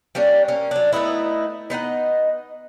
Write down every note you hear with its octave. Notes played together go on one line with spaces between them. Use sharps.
G3 A#3 C#4 D4
A#3 C#4
F#3 D4
A3 B3 D#4 E4
B3 D#4 D#5 F#5